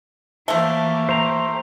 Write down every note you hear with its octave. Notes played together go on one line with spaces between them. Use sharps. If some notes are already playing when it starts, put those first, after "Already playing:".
E3 F3 A3 A#3 G4
C5 A#5